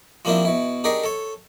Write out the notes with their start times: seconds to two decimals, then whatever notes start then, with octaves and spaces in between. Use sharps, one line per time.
0.25 F3 G3 A#3 C4 D4 E4
0.45 B2 E4
0.84 D4 D#4 G4 G#4 A#4 C#6
1.04 A4 C#5